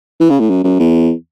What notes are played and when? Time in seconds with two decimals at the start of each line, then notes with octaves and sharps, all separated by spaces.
0.20 E3
0.30 C#3
0.40 A2
0.50 F#2
0.64 F#2
0.80 E2